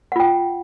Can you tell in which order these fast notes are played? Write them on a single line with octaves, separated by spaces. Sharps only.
F#5 F4 G5